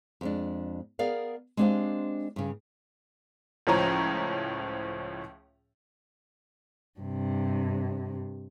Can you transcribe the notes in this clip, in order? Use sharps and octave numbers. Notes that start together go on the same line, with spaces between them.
F2 G#3 D4
B3 G#4 A#4 D5 F5
G#3 C4 D4 G4 C5 F5
G2 C#3
C#2 A2 F3 C#4 A#5
G2 C3